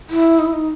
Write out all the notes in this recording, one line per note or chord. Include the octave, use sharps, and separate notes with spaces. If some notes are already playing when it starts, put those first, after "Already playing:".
E4
D#4
E4
D#4